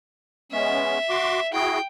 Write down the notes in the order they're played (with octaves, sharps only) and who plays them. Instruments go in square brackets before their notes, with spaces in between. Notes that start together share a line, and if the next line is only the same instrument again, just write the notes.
[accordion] G#3 B3 C#4 [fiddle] E5
[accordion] F#4 C6 D6
[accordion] E4 F#4 G#4 [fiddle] G5